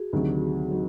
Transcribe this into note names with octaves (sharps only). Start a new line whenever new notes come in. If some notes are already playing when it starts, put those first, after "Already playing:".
Already playing: F#4 G#4
D2 C3 D#3 F#3
C3 D#3 F#3